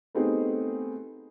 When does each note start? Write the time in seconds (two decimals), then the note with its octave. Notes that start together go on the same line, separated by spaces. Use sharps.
0.15 A3 B3 C4 D#4 G4 G#4